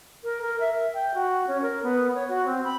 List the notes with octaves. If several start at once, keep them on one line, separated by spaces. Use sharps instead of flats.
A#4
A#4
E5
G5
F#4
C#4
A#4
B3
C#5
F#4
C4
B5